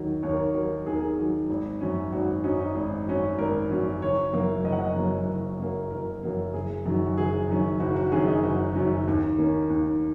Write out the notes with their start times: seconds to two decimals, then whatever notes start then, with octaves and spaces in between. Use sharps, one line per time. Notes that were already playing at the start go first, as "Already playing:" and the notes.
Already playing: D#2 D#3 F#3
0.23 D#2 C#5
0.30 A#4
0.39 C#5
0.54 D#3 F#3 A#4
0.86 D#2 G#4
0.93 A#4
1.00 G#4
1.18 D#3 F#3
1.50 G#1
1.81 F#2 F#3 C#4
2.12 G#1 F#4
2.44 F#2 F#3 C#4 D#4
2.59 D#4
2.75 G#1
3.07 F#2 F#3 C#4
3.38 G#1 A#4
3.71 F#2 F#3 C#4
4.02 F#1 C#5
4.33 F#2 F#3 A#3
4.64 F#1 D#5
4.72 F#5
4.80 D#5
4.96 F#2 F#3 A#3
5.28 F#1
5.59 F#2 F#3 A#3
5.91 F#1 A#4
6.23 F#2 F#3 A#3
6.54 F#1 G#4
6.86 F#2 D#3 F#3 C#4
7.06 F#4
7.18 F#1 G#4
7.48 F#2 D#3 F#3 C#4
7.80 F#1 F#4
7.96 F#4
8.12 F#2 D#3 F#3 C#4 G#4
8.28 D#4
8.43 F#1 F#4
8.75 F#2 D#3 F#3 C#4
9.07 D#2
9.38 D#3 A#3 C#4
9.70 D#2